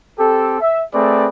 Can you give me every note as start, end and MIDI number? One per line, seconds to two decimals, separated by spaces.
0.19 0.60 60
0.19 0.60 67
0.19 0.60 69
0.61 0.82 76
0.94 1.28 57
0.94 1.28 60
0.94 1.28 68
0.94 1.28 71
0.94 1.28 74